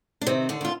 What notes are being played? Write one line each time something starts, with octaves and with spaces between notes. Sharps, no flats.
D4
C3 D#3 C4
D3 D4
D#3
F4